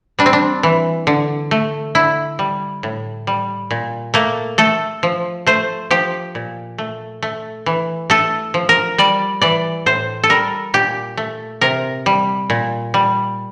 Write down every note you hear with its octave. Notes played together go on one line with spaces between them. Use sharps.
G3 D4
C4
D4
E3
D3
A3
D3 E4
G3
A2
G3
A#2
A3 A#3
A3 A4
F3
A3 C5
F3 G4
A#2
A3
A3
E3
A3 A4
F3
A#4
G3 D5
E3 D5
A2 C5
A4
G3 A#4
A#2 G4
A3
C3 A#4
G3
A#2
G3